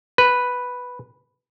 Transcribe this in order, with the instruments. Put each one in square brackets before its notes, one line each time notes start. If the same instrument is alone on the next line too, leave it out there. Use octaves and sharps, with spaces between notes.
[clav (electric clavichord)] B4